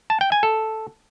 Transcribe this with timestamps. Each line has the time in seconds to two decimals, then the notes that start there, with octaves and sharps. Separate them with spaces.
0.10 A5
0.21 G5
0.32 G#5
0.43 A4